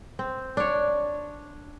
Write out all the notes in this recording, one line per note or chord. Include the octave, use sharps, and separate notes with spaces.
C4
D4 C#5